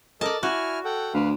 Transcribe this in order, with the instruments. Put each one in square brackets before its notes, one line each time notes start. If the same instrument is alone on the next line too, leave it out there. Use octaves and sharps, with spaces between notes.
[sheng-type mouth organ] A4 A#4 D#5 [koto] D5 A5
[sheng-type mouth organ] E4 G#5 F6 [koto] F#4
[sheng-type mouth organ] A4 F#5 G5
[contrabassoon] D2 [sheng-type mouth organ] B4 F5